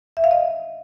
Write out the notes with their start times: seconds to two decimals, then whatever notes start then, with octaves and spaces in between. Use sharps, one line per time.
0.17 E5
0.24 F5
0.31 D#5